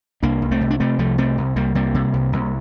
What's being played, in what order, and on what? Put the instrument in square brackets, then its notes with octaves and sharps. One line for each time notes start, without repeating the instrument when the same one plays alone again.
[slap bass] C2 A#3 D4
C2
A3 C4
C3
D4
C3 A3 C4
C2 F3 A3
C3 A3 C4
C2
C2 G3 A#3
C3 G3 A#3
C3
C2
C2